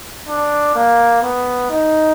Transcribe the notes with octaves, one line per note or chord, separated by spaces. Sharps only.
D4
A#3
B3
D#4